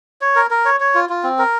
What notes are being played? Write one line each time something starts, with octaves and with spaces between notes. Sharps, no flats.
C#5
A#4
A#4
C#5
C#5
F4
F4
C4
A#4